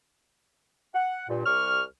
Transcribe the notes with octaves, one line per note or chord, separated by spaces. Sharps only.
F#5
G2 A#2
C2 G3 C#6 F6